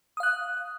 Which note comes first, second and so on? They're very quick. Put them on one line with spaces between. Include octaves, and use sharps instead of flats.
D#6 F5 F#6